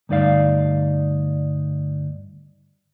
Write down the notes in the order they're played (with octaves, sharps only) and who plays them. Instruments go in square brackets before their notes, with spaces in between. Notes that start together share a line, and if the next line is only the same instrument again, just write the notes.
[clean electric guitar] D2 G2 D#4 D5 F5